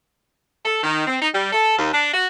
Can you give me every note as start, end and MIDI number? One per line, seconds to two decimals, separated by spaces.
0.65 0.80 69
0.84 1.06 51
1.07 1.16 60
1.20 1.28 63
1.33 1.48 55
1.53 1.78 69
1.78 1.91 39
1.93 2.13 62
2.13 2.27 66